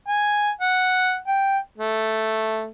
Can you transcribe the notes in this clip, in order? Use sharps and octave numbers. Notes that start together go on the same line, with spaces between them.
G#5
F#5
G5
A3